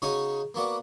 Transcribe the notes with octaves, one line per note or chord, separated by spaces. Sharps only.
C#3 C#4 D#4 F#4 C#5 G#5
A#3 B3 F#4 D5